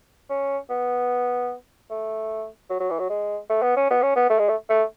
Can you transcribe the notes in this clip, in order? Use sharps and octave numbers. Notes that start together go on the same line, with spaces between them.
C#4
B3
A3
F#3
F#3
E3
F#3
G#3
A3
B3
C#4
B3
C#4
B3
A3
G#3
A3
A3